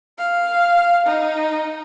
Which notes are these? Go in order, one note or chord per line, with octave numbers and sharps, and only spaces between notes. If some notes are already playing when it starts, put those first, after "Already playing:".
F5
D#4